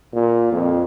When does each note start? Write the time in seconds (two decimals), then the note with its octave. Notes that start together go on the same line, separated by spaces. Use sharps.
0.14 A#2
0.52 F2